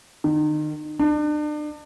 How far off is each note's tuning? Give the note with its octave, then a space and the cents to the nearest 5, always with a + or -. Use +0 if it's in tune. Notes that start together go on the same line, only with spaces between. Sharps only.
D#3 -35
D4 +35